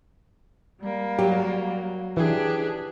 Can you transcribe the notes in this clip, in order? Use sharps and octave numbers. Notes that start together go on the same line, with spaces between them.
G3 A#3
F#3 G4
E3 D4 G4 G#4